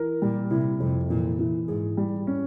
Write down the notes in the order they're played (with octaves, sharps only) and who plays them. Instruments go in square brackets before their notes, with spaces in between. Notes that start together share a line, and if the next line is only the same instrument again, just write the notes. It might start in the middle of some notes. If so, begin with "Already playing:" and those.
Already playing: [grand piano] E3 A#4
[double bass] A#2 [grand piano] G3
[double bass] C3 [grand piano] E4
[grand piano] F2 [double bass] C3
[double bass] A#2 [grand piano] E3
[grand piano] E3
[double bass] G#2 [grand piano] G#4
[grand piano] G3
C#4